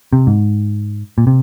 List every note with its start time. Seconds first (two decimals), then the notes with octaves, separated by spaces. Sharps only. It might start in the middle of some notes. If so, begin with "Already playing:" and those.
0.13 C3
0.27 G#2
1.18 A#2
1.27 C3